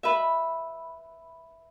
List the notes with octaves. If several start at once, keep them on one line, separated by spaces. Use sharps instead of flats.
B4 E5